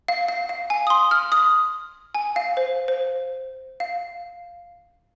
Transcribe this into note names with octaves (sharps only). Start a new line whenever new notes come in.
F5
F5
F5
G#5
D#6
C6
F6
D#6
G#5
F5
C5
C5
F5